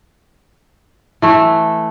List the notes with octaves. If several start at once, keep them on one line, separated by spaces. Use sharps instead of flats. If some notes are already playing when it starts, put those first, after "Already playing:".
E3 A3